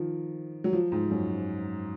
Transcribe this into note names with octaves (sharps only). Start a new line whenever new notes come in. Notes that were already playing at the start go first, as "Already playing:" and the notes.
Already playing: D#3 F3
F#3
F3
G#2
F#2